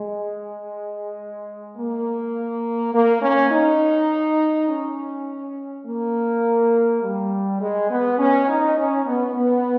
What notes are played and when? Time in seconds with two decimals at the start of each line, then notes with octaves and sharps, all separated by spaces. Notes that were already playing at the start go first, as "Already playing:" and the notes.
Already playing: G#3
1.77 A#3
2.93 A#3
3.23 C#4
3.51 D#4
4.69 C#4
5.85 A#3
7.03 G3
7.60 G#3
7.90 B3
8.18 C#4
8.48 D#4
8.77 C#4
9.06 B3
9.35 B3